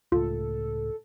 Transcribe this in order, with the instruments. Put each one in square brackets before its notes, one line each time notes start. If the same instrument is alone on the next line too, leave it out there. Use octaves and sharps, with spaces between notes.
[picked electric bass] C#2 A2 [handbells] F4 [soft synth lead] A4